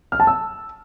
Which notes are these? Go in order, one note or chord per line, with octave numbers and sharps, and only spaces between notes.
F6
A5
E6